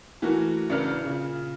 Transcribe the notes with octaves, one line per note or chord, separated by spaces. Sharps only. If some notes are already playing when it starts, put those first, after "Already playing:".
E3 A3 F#4 A#4
A1 C#3 D4 E4 A#4 F6
A#2 C#3